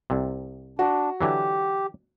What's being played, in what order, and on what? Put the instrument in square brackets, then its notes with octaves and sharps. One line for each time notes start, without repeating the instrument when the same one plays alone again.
[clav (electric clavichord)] C2 C3
[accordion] D4 [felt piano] F#4
[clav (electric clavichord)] D3 E3 F#3 [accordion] G4